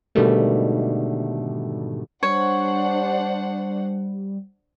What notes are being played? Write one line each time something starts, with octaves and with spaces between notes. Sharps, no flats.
G#2 B2 D3 D#3 G3 A3
G3 D4 C5 C#5 F#5